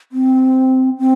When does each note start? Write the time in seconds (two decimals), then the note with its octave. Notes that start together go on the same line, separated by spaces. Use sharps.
0.12 C4
0.99 C4